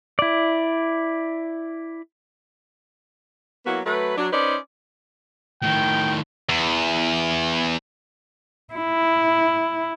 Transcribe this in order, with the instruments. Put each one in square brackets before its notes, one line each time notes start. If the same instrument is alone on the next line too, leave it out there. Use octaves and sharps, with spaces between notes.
[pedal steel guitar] E4 D5
[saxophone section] F#3 A#3 B3 E4 F#4
F#3 A3 B4
F#3 D4
C#4 D#4 B4 C5 D5
[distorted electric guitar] A2 D#3 [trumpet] G5
[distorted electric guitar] E2
[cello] E4